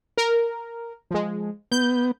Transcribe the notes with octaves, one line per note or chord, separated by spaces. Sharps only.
A#4
F3 G#3
B3 G6